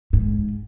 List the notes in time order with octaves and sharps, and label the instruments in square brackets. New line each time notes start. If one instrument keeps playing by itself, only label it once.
[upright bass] G#2